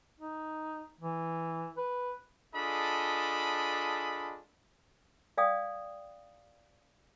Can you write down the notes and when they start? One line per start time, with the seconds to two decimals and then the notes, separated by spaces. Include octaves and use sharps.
0.20 D#4
1.01 E3
1.77 B4
2.55 D4 F4 G#4 A4 D#5 B5
5.38 D5 F5 G5 D#6